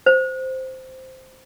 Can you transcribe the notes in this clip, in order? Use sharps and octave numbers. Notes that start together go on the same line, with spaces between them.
C5